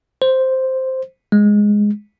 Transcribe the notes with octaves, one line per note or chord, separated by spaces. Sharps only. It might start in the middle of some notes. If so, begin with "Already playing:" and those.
C5
G#3